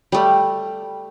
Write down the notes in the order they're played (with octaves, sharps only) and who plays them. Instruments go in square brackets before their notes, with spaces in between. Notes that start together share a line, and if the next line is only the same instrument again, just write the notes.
[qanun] G3 A3